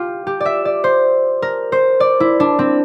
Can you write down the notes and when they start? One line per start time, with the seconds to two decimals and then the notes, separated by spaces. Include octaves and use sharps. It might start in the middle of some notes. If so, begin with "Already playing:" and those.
Already playing: F4 G4
0.27 G4
0.41 D5 E5
0.65 D5
0.84 C5
1.42 A#4
1.72 C5
2.00 D5
2.20 E4
2.40 D4
2.59 C4